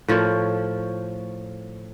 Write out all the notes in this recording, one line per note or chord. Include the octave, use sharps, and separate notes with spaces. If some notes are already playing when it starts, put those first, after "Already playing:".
A2 F3 A#4 C#5